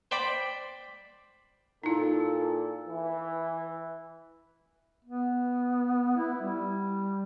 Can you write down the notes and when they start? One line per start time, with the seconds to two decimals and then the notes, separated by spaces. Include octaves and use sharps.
0.11 C5 D5 G5 B5
1.84 A#2 D#4 E4 A4
2.87 E3
5.05 B3
6.17 E4
6.41 G3